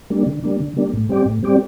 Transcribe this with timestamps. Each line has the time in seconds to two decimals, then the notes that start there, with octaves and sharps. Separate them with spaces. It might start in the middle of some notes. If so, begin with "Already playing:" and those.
0.10 G3 A#3 D4
0.26 D3
0.44 G3 A#3 D4
0.60 D3
0.77 G3 A#3 D4
0.94 A2
1.09 G3 C4 G4 D5
1.26 A2
1.43 G3 C4 G4 D5